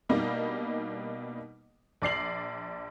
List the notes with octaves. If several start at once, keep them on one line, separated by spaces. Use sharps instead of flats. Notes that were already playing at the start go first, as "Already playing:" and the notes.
B2 G3 A#3 D4 D#4
A#1 D5 C7 F#7